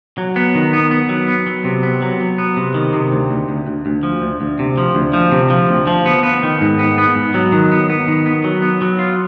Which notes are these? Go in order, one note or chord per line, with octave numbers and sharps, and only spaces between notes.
F#3
B3
D#3
B3
B3
F#3
B3
F#3
C3
B3
F#3
F#3
B3
C3
D#3
C3
D2
D2
D2
D2
D2
F3
D2
D2
C3
F3
D2
F3
C3
F3
D2
F3
B3
B3
D#3
G#2
B3
B3
G#2
F#3
D#3
B3
B3
D#3
B3
F#3
B3
F#3
F4